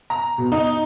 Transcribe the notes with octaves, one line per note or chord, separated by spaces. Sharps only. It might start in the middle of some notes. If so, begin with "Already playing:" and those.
A#5
B2
D#4